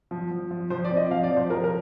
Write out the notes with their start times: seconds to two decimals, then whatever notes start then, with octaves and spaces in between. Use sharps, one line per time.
0.11 F3
0.31 F3
0.51 F3
0.70 F3 C5
0.85 D5
0.91 C4
0.97 D#5
1.10 F3 F5
1.23 D5
1.30 F3
1.37 C5
1.50 F3 A#4
1.64 A#4